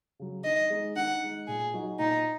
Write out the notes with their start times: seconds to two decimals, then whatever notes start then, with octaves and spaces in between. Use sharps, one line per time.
0.19 C#3 F#3
0.44 D#3 D#5
0.70 G#3 D#4
0.96 D#3 F#5
1.22 G#3 D#4
1.48 A#2 G#4
1.73 F#3 D#4 F#4
1.99 A#2 D#4